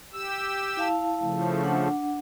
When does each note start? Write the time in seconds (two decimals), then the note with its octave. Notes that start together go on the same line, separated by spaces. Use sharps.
0.13 G4 E6
0.77 E4 F5 A5
1.20 C#3 F3 A3
1.64 D4 F#5